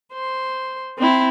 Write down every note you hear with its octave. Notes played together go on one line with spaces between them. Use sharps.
C5
C4 E4